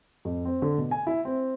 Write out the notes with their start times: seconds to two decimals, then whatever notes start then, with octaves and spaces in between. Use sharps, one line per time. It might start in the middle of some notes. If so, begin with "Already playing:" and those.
0.25 F2
0.45 C4
0.62 D3
0.78 B2
0.91 G#5
1.07 E4
1.25 C4